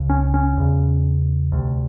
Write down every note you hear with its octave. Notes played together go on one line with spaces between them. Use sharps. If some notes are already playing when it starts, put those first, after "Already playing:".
Already playing: C#2 C#3
C#4
C#4
E2 C#3
D2 C3